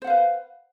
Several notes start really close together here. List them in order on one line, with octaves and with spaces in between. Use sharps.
C5 F#5 F5 B4